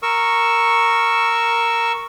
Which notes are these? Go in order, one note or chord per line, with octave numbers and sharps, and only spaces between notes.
A#4 C#6 E6